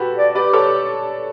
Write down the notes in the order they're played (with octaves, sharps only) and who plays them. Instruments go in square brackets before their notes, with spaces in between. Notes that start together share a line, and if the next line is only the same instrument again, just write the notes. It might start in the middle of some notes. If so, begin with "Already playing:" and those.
Already playing: [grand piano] F#4 G4 A4 B4
[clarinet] D5
[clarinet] G4 [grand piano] B4 D5
[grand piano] A4 C#5